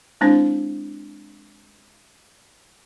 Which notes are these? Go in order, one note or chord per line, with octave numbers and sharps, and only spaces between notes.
G#3 C4 D4 E4 C5